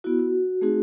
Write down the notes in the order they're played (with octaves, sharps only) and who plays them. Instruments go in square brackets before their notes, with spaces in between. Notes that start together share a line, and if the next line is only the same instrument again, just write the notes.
[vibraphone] B3 E4 F#4
F#4
A3 C4 D#4 F#4 G#4